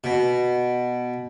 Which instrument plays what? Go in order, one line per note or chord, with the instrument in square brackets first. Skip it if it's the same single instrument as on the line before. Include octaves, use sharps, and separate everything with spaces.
[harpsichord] B2